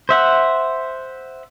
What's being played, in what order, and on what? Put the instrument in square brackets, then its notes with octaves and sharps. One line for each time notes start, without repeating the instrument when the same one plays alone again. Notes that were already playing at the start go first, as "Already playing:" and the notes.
[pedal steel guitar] C5 E5 F#5